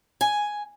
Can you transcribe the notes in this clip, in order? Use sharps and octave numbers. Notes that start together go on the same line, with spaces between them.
G#5